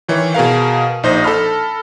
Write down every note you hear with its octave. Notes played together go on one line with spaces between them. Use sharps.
D#3 E3 C#5
B2 G#4 A#4 F5
A#1 D#4 C5 D#6 A#6
A4 A5 B5 F6